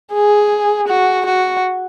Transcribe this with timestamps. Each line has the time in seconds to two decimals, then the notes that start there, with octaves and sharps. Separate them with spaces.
0.14 G#4
0.88 F#4
1.26 F#4